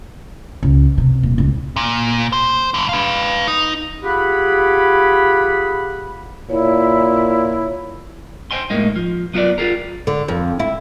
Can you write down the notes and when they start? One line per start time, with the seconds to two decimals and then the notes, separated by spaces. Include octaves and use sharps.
0.63 C#2
0.98 C3
1.23 D#1
1.38 C#2
1.76 A#2
2.33 C5
2.74 G2 D3
2.89 B4 F5
3.48 D#4
4.03 F4 G4 G#4 F#5 B5
6.50 A#2 E4 C#5
8.51 C5 G5 G#5 C6
8.70 A2 G#3 A#3 D#4
8.96 F3
9.34 F#3 B3 F4 F#4 A#4 D5
9.58 F4 G4 G#4 A#4
10.07 D3
10.28 F2
10.60 E4